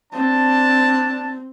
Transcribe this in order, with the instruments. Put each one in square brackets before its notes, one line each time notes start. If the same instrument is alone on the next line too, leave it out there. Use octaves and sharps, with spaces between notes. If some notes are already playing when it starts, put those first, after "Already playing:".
[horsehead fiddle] C4 [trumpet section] D4 A5